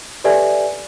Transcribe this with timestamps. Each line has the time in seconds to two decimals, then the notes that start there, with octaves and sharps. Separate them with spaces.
0.24 G4 A4 B4 D5 E5 G#5